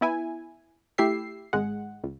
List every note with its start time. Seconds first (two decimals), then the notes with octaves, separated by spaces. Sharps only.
0.01 B3 E4 G#5
0.98 A3 E4 G4 E5 C7
1.53 G#1 G#2 G#3 F#5
2.04 C#2